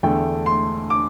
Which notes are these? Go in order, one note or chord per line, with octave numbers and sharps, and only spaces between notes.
E2 D3 A3 G5
C6
D6